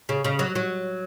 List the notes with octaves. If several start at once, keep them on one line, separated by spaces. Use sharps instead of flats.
C#3
C#3
F#3
F#3